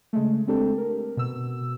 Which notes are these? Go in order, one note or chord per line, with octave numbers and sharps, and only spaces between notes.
C#3 G#3 A3
G#3 C4 D4 G4 A4
A#4
B2 E6